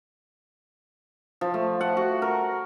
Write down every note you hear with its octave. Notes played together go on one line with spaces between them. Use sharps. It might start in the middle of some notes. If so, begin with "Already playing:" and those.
F3
A3
F#5
F#4
A#4